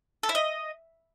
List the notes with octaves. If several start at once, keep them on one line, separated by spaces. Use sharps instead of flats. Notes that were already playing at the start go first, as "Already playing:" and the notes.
A4
E4
D#5